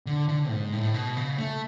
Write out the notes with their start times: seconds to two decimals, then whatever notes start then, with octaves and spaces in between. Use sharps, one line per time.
0.06 D3
0.29 D3
0.50 G#2
0.73 A2
0.94 B2
1.17 C#3
1.38 A3